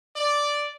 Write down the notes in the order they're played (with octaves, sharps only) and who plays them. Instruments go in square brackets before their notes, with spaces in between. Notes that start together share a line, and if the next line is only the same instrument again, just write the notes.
[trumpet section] D5